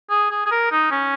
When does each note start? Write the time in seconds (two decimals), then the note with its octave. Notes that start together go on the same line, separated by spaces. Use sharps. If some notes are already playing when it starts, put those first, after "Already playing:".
0.10 G#4
0.31 G#4
0.46 G#4
0.52 A#4
0.71 D#4
0.92 C#4